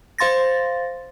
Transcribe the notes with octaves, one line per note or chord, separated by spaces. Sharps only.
C5 F5 C6 A6 A#6